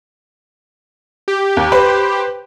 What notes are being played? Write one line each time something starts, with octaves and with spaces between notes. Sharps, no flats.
G4
D#2
B4 C5